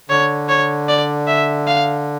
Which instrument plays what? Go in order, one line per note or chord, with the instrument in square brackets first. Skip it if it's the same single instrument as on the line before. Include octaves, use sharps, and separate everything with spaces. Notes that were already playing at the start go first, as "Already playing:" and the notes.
[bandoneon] D3 [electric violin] C#5
[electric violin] C#5
D5
E5
F5